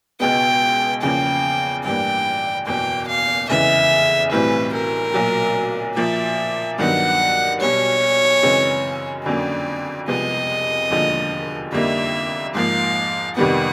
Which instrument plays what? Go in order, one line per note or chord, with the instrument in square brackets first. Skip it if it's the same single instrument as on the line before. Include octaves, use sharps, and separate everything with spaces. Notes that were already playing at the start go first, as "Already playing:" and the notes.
[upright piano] C#2 B2 G#3 B3 [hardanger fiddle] G5
[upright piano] E2 C#3 F3 A#3 C#4 [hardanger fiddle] G5
[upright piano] A1 G2 E3 G3 A#3 [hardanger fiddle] G5
[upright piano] F#1 E2 B2 [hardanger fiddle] G5
[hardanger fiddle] F5
[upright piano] F1 E2 C#3 E3 G#3 [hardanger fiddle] E5
[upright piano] B1 A2 E3 G3 C4 [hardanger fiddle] B4
[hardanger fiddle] A#4
[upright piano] B1 A#2 F#3
[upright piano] A#2 F3 A#3 [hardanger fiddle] E5
[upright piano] G2 D#3 F#3 B3 [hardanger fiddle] F#5
[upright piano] B1 B2 G3 [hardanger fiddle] C#5
[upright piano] F#2 C#3 E3 G#3 C4
[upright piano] F2 D3 F#3 A#3 C#4 [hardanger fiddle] D5
[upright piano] C2 C3 F3 G#3 B3 [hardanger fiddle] D#5
[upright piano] E1 D#2 D3 F3 G#3
[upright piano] F2 D3 G3 A#3 D#4 [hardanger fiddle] E5
[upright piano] G#2 F3 A#3 [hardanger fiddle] F5
[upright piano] F2 C3 D#3 G3 B3 [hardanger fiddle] F#5